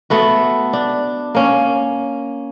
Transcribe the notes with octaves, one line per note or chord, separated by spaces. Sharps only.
A3 B3 F#4
D4
A#3 C#4